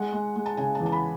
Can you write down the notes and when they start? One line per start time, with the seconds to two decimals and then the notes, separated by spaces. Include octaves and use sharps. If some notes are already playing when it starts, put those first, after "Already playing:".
Already playing: G#3 F#5
0.13 G#3
0.36 G#3
0.46 A5
0.57 C#3 G#5
0.75 A5
0.80 E2
0.86 A5
0.92 B5